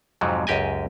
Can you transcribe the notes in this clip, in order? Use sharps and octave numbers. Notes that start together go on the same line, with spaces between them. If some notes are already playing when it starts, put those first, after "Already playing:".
F2 G#2 C3 F3 F#3
C#2 F#2 G4 D#5 G#5